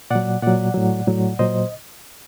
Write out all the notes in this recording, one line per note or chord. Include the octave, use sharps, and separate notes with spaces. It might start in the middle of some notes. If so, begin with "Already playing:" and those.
A#2 F#3 D5 F#5
A#2 F#3 D5 F#5
A2 F#3
A2 F#3
A#2 F#3 C5 D#5